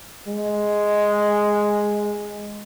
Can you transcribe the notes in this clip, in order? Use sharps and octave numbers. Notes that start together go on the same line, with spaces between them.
G#3